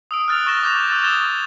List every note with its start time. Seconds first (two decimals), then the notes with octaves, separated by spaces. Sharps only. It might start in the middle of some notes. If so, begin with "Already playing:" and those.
0.11 D#6 E6 D7
0.28 F6 F#6 A6 D7 F7
0.46 C#6 F6 A6 A#6 E7 G7
0.63 D6 F#6 G6 A#6 E7 F7
0.89 C#6 E6 F#6 A6 A#6
1.02 D#6 E6 G#6 A6 E7 G7